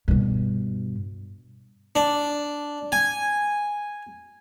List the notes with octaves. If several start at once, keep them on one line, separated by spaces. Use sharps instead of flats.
G2 B2
D4
G#5